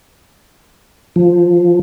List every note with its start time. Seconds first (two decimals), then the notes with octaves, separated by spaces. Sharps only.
1.16 F3